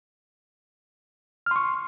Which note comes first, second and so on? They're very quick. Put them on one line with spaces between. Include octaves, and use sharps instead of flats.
F6 C6 C#6